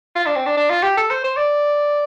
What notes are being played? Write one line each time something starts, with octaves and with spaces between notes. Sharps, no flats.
F4
D4
C4
D4
D4
F4
G4
A4
C5
C5
D5